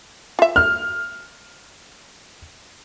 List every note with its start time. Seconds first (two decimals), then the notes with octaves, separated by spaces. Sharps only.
0.39 F4 E5
0.56 F6